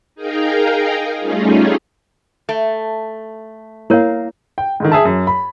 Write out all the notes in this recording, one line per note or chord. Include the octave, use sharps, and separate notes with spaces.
D#4 G#4 A#4 F5 G5 A#5
G3 A3 C#4 D#4 F4 G#4
A3
A#3 E4 A#4 C#5 F5
G5
G#2 D3 D#3
G#4 E5 A5
F#2
B5